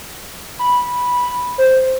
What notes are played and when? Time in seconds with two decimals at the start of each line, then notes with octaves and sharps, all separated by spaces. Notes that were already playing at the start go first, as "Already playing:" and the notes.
0.59 B5
1.58 C5